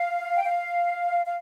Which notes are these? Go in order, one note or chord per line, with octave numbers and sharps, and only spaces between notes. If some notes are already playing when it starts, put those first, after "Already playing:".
Already playing: F5
G5
F5
F5